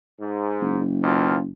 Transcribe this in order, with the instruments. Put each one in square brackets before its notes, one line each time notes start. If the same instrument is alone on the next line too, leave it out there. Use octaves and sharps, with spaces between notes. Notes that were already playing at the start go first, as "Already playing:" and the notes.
[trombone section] G#2
[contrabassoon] F#1
[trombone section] D#2 B2 F4